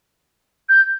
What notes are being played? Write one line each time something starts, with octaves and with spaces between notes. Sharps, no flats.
G6